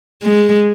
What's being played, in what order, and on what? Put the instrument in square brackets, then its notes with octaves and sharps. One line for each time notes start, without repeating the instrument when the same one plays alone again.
[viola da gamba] G#3